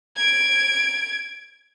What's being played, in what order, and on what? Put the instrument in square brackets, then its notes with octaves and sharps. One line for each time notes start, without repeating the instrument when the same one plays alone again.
[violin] G#6 D7